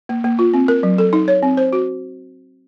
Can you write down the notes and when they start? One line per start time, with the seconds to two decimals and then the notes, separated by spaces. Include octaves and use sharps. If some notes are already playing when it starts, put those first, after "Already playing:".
0.09 A#3
0.24 A#3
0.39 F4
0.54 C4
0.68 A#4
0.83 F#3
0.98 A4
1.13 D#4
1.28 C#5
1.43 C4
1.57 C5
1.73 F#4